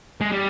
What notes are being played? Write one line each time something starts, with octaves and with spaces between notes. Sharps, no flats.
G#3
G3